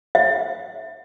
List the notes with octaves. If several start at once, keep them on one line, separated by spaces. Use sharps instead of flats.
E5